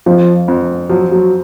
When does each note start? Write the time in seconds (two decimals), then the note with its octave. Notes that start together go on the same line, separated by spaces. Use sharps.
0.06 F2 F3
0.48 F2
0.89 F3 F#3
1.12 F#3